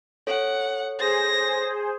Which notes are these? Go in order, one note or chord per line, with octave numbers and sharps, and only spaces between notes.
A4 C#5 F#5
G#4 C5 A#6